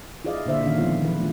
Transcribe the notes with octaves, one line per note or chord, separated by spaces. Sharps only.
E4 F4 G#4 D5 D#5 F5
A#2 D3 C5 E5
D#3 C#4 F5
F3 G3 G#3 B3 C4 F4
E3 F3 B4
A3 D4 F4